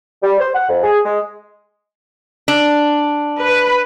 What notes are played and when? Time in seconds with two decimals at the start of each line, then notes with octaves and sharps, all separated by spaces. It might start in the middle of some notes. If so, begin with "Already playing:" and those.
0.23 G3
0.40 C5
0.54 F#5
0.69 F2
0.83 G#4
1.04 G#3
2.48 D4
3.43 B4